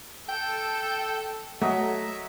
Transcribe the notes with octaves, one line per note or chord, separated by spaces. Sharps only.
A4 G5
F#3 A3 D#5 E5